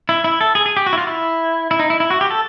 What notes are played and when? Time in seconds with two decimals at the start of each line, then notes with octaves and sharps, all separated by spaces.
0.09 E4
0.24 E4
0.41 A4
0.55 G#4
0.66 G#4
0.77 G4
0.86 F#4
0.93 E4
0.98 F4
1.07 E4
1.71 E4
1.79 D#4
1.90 E4
2.00 E4
2.10 F#4
2.21 G4
2.30 A4